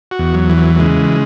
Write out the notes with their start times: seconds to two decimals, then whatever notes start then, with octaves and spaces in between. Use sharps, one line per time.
0.11 F#4
0.19 E2
0.34 F#3
0.49 E3
0.57 F#3
0.76 F#3
0.79 C#3 G#3